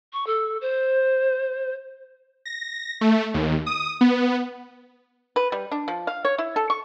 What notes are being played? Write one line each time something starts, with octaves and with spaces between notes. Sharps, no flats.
C#6
A4
C5
A#6
A3
D#2
D#6
B3
B4
G3
D4
F3
F5
C#5
E4
A4
C#6